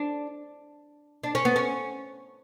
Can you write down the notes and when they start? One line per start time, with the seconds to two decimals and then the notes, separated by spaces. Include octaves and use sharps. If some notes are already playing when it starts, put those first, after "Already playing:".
Already playing: D4
1.24 D4
1.35 C#4
1.45 B3
1.56 C#4